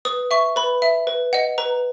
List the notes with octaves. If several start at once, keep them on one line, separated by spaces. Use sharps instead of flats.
B4 D#6
E5 C#6
B4 B5
E5
B4
D#5 F#5
B4 A#5